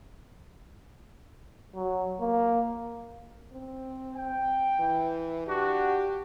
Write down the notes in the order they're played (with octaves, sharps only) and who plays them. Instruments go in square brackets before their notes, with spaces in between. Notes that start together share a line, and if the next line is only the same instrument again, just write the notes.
[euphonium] F#3
A#3
[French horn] C4
[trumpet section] G5
[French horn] E3
[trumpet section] D4 F#4 [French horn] G4